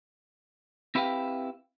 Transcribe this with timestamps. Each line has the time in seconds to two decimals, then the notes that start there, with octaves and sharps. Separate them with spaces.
0.95 C4 E4 G4 B4 F5 G5